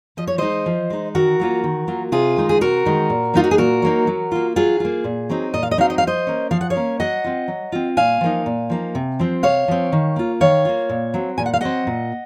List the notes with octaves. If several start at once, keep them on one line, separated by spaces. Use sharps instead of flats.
F3 D#5
C#5
G#3 D#4 C5 D#5
F3
G#3 D#4
D#3 F#4 A#4
F#3 A#3 F4
D#3
F#3 A#3 F4
C3 F4 G#4
D#3 G#3 D#4
G#4
C3 F#4 A#4
D#3 G#3 D#4
A#2
F#3 A#3 D#4 F4
F#4
G#4
A#2 F#4 A#4
F#3 A#3 D#4
F#3
A#3 F4
F#3 F4 G#4
A#3 F4
A#2
F#3 C4 D#4
A#2 D#5
F5
D#5
F#3 C4 D#4 F5
D#5
F3 F5
C5 D#5
A#3 C#4
F3 F5
F#5
C#5 F5
A#3 C#4
F#3 D#5 F#5
C4 F4
F#3
C4 F4
A#2 F5 G#5
F3 A#3 D#4
A#2
F3 A#3 D#4
C3
F3 C4
C3 C#5 F5
F3 C4
D#3
A#3 F4
D#3 C#5 F5
A#3 F4
A#2
F#3 C4
A#2 G#5
F#5
F5
F#3 C4 D#5 F#5
A#2